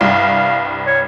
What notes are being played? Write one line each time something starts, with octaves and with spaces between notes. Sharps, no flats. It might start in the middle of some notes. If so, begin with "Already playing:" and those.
C2 G2 F5
C#5